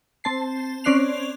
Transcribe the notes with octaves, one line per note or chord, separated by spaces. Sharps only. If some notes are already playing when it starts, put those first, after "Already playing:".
C4 A5 C7
C4 C#4 D5 F#6 C7 F7